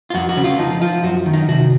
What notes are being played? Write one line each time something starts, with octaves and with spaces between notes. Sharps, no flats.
F4
F2 F#4
F#4
C#3
F4
F3 D#4
F3 F4
F#2 F#4
D#3
D#4
C3 F#4